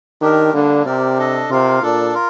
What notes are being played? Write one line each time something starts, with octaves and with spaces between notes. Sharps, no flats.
D#3 D4 G4 A#4
D3 G3 A#3 D4
C3 C4 G4 A#4 D5
D4 A4 D#5
C3 F4 A#4 F5
A#2 D4 A4 D5
F4 A#4